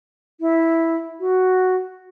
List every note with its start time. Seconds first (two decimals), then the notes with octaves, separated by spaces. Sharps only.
0.40 E4
1.20 F#4